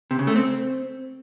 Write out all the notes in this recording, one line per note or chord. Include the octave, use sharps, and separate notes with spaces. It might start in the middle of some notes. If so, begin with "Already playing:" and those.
C3
C#3
A3
C4